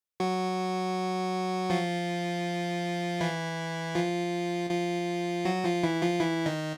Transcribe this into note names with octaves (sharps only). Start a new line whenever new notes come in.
F#3 F#4
F3 F4
E3 E4
F3 F4
F3 F4
F#3 F#4
F3 F4
E3 E4
F3 F4
E3 E4
D#3 D#4